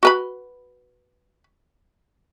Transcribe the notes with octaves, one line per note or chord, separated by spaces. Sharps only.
F#4 B4 B5